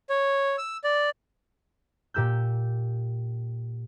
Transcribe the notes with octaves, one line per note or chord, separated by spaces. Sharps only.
C#5
E6
D5
A#2 G4 E6 G6